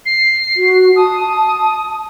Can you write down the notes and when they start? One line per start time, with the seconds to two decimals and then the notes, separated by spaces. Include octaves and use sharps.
0.06 C7
0.56 F#4
0.96 A5 D#6